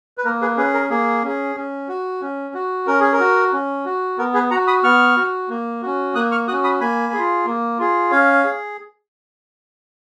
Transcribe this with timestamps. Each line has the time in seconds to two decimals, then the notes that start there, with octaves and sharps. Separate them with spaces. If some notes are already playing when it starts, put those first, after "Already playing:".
0.18 B4
0.25 A#3 A#4
0.41 G#4 B4
0.57 C#4 G#4 B4
0.74 A#4
0.90 A#3 G#4
1.23 C#4 G#4
1.56 C#4
1.89 F#4
2.21 C#4
2.54 F#4
2.87 C#4 A#4
3.00 G#4
3.13 A#4
3.20 F#4
3.53 C#4
3.85 F#4
4.18 B3 A#4
4.34 G#4 B4
4.51 F#4 F#5 A#5
4.67 B5 D#6
4.83 B3 C#6 F6
5.17 F#4
5.49 A#3
5.82 C#4 F#4
6.15 A#3 D#6 F#6
6.31 C#6 F6
6.47 F#4 D#6 F#6
6.52 C#4
6.64 B5 D#6
6.80 A#3 G#5 B5
7.13 F4 G#4
7.46 A#3
7.79 F4 G#4
8.11 C#4 C#5 F5
8.44 G#4